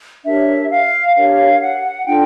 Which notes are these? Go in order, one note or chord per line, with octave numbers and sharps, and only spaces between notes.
D4 G4 A#4 C#5 E5
F5
D4 G4 A#4 C#5 F5
F#5
D4 F4 A4 G5